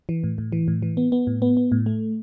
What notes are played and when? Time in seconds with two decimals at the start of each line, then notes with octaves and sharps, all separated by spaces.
0.09 E3
0.24 A2
0.38 A2
0.52 E3
0.68 A2
0.82 E3
0.97 B3
1.12 B3
1.27 A2
1.42 B3
1.57 B3
1.72 A2
1.86 A3